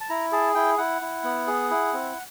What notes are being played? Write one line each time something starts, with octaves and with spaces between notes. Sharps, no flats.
A5
E4 A#5
G#4 A5
E4 G5
E4 F#5
E4
B3
G#4
E4
C4